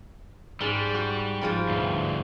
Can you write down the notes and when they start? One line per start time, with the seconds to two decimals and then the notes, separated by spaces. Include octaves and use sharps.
0.61 G#2 G3 D5
0.94 F#4
1.41 G#2 F3 G3
1.69 D2 G2